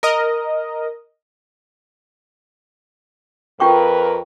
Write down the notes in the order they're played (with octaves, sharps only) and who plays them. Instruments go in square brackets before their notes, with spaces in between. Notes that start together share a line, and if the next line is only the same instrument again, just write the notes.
[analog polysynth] A#4 D#5
[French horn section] F2 A#4 B4 [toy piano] F4 G5 C#6